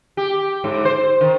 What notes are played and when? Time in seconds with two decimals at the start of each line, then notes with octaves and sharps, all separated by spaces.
0.17 G4
0.64 G#2
0.85 C5
1.21 D#3